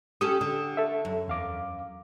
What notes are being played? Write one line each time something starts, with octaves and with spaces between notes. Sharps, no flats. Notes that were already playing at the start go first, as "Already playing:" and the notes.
C#4 G4 A4 D#6
D3
A4 E5
F#2
E2 F5 D6